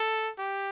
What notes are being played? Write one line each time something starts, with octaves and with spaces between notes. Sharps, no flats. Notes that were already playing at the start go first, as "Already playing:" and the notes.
Already playing: A4
G4